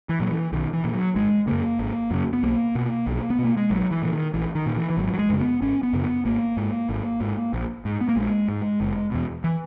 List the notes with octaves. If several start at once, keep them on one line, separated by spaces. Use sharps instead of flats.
E3
A#2 F#3
E3
B1 D#3
E3
A#2
F#3
G#1 G#3
F#2 C#3 A#3
G#1
F#2 C#3
B3
B1 A#3
B2
B1
B3
B2
A#3
G#3
A#1 F#3
E3
A#2 E3
D#3
A#1 E3
D#3
A#2
E3
E3
G#1 F#3
F#3
G#3
F#2 C#3
B3
G#1 C#4
B3
F#2 C#3
B3
G#1 A#3
G#2
G#1
G#2
A#1
G#2
B3
A#3
A#1 G#3
G#2
F#1
E2 B2
E3